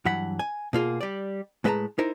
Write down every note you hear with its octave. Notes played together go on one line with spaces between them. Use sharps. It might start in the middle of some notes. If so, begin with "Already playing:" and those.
G2 E3 F#3 F#5 B5
G#5
B2 A#3 F4 G#4
G3 D5
A2 G#3 B4 E5 A5 A#5
D#4 E4 A#4 C5